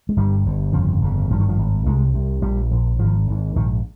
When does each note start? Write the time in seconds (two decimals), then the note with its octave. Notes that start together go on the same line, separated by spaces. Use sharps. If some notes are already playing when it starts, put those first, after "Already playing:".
0.09 G#3
0.17 G1 G2 G3
0.46 G1 G2
0.73 G1 F2 C#3 F3
1.01 G1 F2 C#3
1.30 G#1 G2 F3
1.40 D#3
1.49 F3
1.59 G#1 G2
1.86 C2 C3 G#3
2.14 C2 C3
2.42 A#1 A#2 G3
2.71 A#1 A#2
2.99 G#1 G#2 F3
3.27 G#1 G#2
3.56 A#1 G#2 D#3